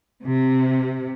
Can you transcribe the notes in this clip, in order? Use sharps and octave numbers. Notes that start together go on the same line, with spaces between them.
C3